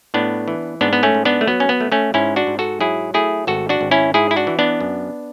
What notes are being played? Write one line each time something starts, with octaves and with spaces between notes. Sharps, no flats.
A2 B3 D4
E3
G#2 B3 D4
B3
A3 C#4
G#2
B3 D4
A3
F#3 B3
C#4
B3
A3
A3 C#4
G#2 C#4 E4
D4 F#4
G#2
F#4 A4
F#3 E4 G#4
A3 E4 G#4
G#1 F#4 A4
D4 F#4
G#1
C#4 E4
G#2 E4 G#4
E4
D4 F#4
E3
B3 D4
F#2